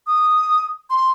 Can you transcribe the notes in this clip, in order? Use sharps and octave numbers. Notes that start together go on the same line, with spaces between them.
D#6
C6